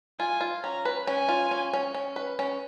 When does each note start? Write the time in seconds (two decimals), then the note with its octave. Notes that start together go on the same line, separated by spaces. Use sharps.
0.19 F4 G#5
0.41 F4
0.64 C#4 A#5
0.85 B4
1.07 C#4 G#5
1.29 F4
1.51 C#4
1.73 C#4
1.95 C#4
2.16 B4
2.39 C#4